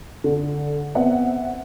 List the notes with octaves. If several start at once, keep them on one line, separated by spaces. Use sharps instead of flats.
D3
B3 C4 E5 F#5